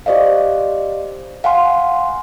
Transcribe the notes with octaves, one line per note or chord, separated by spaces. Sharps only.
G4 C5 D5 D#5 F5
F5 F#5 G#5 C6